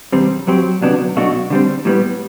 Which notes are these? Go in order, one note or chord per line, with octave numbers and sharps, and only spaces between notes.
E2 C3 G3 C4
F#2 F#3 C4 G4
D2 C3 F#3 B3 D4
B1 B2 A3 D4 F#4
D3 G3 C4
A2 G3 B3